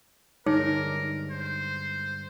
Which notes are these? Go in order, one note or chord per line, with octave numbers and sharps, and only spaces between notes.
G2 D3 G#3 D#4 G#4 A#4 C#5
C5